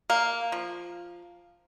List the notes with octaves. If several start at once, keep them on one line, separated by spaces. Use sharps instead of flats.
A#3
F3